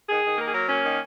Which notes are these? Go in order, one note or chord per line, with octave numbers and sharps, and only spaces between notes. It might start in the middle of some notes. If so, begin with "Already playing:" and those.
D#3 G#4
D#3
A#3 A#4
G#4
F#3 A#4
A#3 C#4
D#3